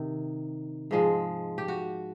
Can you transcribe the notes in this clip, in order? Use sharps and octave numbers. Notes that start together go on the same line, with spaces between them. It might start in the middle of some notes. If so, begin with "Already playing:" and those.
Already playing: C3 D#3
G#2 F3 G#3
G4
F#4